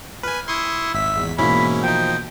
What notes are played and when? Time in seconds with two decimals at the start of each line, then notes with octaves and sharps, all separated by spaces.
0.23 B4 G#5 F6
0.48 E4 C6 C#6 D#6
0.95 G#1 E5 B6
1.16 E2
1.38 G#2 B2 E3 A#3 C#4 E4 B5
1.84 F3 D#4 G5